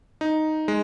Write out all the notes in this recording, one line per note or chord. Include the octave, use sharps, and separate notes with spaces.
D#4
G#3